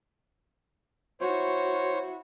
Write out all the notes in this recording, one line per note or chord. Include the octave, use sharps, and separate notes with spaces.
E4 F#4 C5 C#5